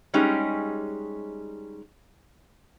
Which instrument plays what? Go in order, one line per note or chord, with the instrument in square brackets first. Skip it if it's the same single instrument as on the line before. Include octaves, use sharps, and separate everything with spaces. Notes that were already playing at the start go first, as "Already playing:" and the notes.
[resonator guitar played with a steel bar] G3 G#3 C#4 D#4 G4 G#4